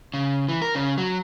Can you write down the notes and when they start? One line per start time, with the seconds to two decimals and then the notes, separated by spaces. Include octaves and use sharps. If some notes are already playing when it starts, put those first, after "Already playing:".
0.14 C#3
0.49 E3
0.62 A#4
0.75 C#3
0.98 F#3